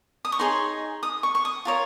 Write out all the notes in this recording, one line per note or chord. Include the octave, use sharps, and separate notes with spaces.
D#6
C#6
D#4 G#4 C#5 C6
D#6
C#6
C#6
D#6
F4 A#4 C#5